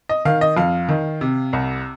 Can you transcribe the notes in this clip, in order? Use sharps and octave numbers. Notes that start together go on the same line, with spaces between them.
D#5
D#3 F5
D#5
F2 F5
D#3
C3
C2